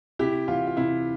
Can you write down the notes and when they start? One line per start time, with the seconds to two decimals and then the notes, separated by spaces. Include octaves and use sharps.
0.19 C3 E4 G4
0.48 E3 F4
0.67 F4
0.77 C3 E4